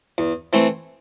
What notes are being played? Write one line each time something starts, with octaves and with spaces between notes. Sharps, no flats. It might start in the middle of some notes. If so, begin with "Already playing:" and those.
E2
E3 A3 C4